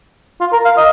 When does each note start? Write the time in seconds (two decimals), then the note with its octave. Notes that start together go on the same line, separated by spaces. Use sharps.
0.40 F4
0.53 A#4
0.65 F5
0.77 D#5